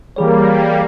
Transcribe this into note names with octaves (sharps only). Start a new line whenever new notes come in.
E3 G3 A#3 G#4 C#5